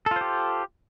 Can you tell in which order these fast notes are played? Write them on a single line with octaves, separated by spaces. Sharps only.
A4 F4 C5 G4